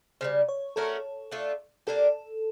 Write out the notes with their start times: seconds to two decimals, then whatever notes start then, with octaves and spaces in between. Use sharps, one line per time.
0.21 C#3 E3 G3 C5
0.48 C#5
0.76 A3 C#4 F#4 A4 A#4
1.31 A3 D4 F4
1.87 A#3 D4 G4 A4